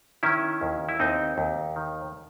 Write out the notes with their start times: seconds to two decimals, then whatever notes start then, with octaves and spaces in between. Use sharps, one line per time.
0.23 D#3 C#4 E4
0.61 D#2
0.89 E4
0.99 D#2 C4 D#4
1.38 D#2
1.76 D#3